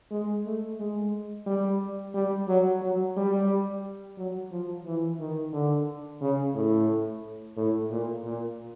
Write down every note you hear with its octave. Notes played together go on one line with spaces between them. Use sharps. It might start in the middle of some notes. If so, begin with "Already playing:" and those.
G#3
A3
G#3
G3
G3
F#3
F#3
G3
F#3
F3
E3
D#3
D3
C#3
A2
A2
A#2
A#2